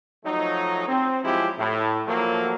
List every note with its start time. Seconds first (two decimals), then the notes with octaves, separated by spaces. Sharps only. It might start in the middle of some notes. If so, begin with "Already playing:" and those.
0.25 F3 F#3 A3 D#4
0.87 C4
1.24 F3 F#3 G#3 E4 G4
1.59 A2
2.07 F3 F#3 A3 A#3